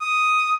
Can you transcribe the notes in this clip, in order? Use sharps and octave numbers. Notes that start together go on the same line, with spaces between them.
D#6